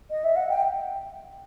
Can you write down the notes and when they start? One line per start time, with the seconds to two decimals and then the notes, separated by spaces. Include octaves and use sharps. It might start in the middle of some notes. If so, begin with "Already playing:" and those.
0.11 D#5
0.24 E5
0.36 F#5
0.49 G5